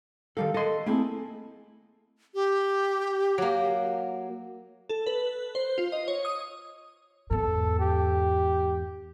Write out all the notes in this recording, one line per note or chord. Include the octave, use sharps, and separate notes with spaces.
D#3 G3 A4 A#4 F5
A4 D#5 C6
A3 A#3 C4 E4 G#4
G4
F#3 A#3
A4
B4
C5
F4
D#5
C#5
D#6
E2 G#2 A4
G4